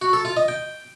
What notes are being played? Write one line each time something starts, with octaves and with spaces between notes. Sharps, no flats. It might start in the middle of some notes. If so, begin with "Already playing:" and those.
F#4
A4
F4
D#5
G5